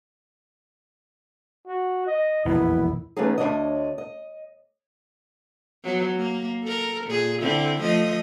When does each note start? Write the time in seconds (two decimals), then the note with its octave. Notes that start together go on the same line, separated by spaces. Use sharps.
1.67 F#4
2.07 D#5
2.45 E1 A#1 F2 B3 E4
3.16 E3 A3 B3 C#4 D#4 G#4
3.38 D2 C3 D4 C#5 D#5
3.98 D#5
5.85 F#3 B3
6.16 A#3
6.63 A4 A#4
7.07 A#2 G#4
7.41 D3 C4 E4
7.80 F3 A3 D#5